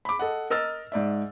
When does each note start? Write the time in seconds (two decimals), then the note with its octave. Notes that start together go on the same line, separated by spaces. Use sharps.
0.05 B5 D6
0.19 A4 D#5 F#5
0.50 A#4 D#5 E6 F6 A6
0.92 G#2 D5 E5